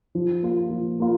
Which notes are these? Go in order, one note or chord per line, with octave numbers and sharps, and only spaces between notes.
F3
A#3 F4
F3
A#3 F4